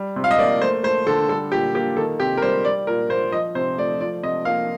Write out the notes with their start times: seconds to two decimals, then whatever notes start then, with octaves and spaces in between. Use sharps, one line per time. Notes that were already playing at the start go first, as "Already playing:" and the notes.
Already playing: G3
0.16 C3
0.24 F5
0.31 D#5
0.38 A#3 D5
0.61 A3 C5
0.83 A3 C5
1.06 D3 A4
1.29 G3 A4
1.52 A#2 G4
1.75 A#3 G4
1.97 D#3 A4
2.20 C3 G4
2.37 A#4
2.42 G3 C5
2.65 G3 D5
2.87 A#2 A#4
3.10 A#3 C5
3.32 F3 D#5
3.55 C3 C5
3.78 A3 D5
4.01 F3 D5
4.23 C3 D#5
4.45 A#3 F5